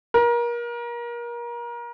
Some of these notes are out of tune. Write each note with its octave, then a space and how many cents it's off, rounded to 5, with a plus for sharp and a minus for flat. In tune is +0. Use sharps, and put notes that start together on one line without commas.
A#4 +30